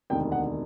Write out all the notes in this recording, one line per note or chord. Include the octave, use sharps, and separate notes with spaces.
E1 D2 C3 D#3 G5
F#5